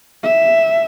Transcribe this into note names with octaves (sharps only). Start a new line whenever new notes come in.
E5